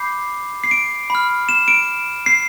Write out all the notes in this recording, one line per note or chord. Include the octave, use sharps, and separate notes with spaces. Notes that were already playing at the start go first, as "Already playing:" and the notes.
Already playing: B5 D6 G6 C7
C7
D7
B5 F6
E7
D7
C7